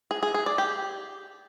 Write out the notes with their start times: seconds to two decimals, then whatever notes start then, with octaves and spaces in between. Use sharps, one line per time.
0.11 G#4
0.23 G#4
0.34 G#4
0.46 D5
0.58 G4